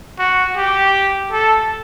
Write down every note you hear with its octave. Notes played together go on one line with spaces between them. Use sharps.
F#4
G4
A4